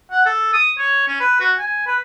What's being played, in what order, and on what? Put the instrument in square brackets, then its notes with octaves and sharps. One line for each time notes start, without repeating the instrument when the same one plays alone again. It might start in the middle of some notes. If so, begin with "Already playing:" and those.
[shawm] F#5
A4
D#6
C#5
C#4
B4
F#4
G#5
B4